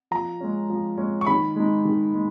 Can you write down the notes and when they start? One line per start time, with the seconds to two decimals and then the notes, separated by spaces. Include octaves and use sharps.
0.11 F3 A#5
0.40 G#3 C#4
0.70 F3
0.98 G#3 C#4
1.21 C#6
1.26 D#3 B5
1.56 G#3 D#4
1.85 D#3
2.15 G#3